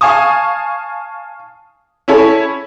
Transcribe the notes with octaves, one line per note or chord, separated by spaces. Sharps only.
F5 G#5 A5 C#6 D#6
C#4 E4 A4 C#5